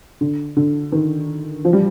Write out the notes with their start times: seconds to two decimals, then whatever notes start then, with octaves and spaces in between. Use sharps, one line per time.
0.21 D3
0.57 D3
0.92 D#3
1.65 F3
1.73 G3